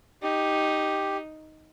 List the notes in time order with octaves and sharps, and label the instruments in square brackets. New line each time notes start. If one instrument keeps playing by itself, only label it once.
[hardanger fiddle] D#4 [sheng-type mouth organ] G4